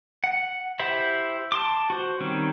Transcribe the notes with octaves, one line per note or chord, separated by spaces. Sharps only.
F#5
E4 G4 C5 E5 B5
A5 C6 D6
F#4 C5
D#3 G3 C4 C#4